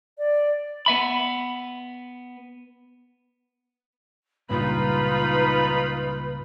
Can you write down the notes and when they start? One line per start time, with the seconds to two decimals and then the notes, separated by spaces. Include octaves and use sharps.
0.18 D5
0.86 B3 E5 B5
4.49 C#2 G2 A#2 D#4 F4 B4 B5